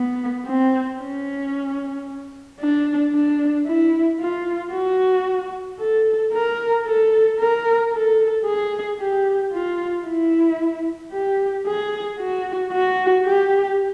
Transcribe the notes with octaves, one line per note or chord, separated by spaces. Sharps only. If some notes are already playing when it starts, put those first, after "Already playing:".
Already playing: B3
C4
C#4
D4
D4
E4
F4
F#4
A4
A#4
A4
A#4
A4
G#4
G4
F4
E4
G4
G#4
F#4
F#4
G4